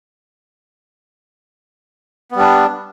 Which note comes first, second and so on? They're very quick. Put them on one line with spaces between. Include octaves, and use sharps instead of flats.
B3 G3 D4